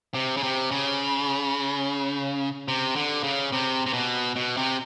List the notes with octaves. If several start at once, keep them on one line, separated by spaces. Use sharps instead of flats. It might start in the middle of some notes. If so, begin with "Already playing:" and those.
C3
C#3
C3
C#3
C3
D3
C#3
C3
C3
B2
B2
C3